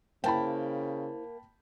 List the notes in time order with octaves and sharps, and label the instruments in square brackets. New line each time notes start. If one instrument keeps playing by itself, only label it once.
[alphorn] C#3 [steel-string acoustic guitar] A#3 [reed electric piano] E4 C5 [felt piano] G5 A5 B5